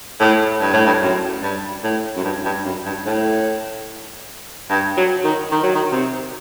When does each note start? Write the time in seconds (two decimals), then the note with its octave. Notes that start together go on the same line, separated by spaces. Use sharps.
0.20 A2
0.61 G2
0.73 A2
0.86 G2
1.02 F#2
1.42 G2
1.83 A2
2.16 F#2
2.24 G2
2.45 G2
2.65 F#2
2.85 G2
3.06 A2
4.70 G2
4.97 F#3
5.24 D#3
5.51 D#3
5.63 F#3
5.75 D#3
5.92 C3